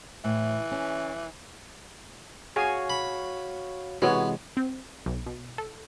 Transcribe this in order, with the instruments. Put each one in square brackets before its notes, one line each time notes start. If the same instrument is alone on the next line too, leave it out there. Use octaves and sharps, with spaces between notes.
[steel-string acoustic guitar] A2 [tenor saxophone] E3
[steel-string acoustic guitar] C#4
[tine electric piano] F#4 C#5 F5 [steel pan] G#4 G#5
[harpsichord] B5
[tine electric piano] C3 E3 G#3 [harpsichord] B3 [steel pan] F#4 C#5
[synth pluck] C4
B1
B2
A4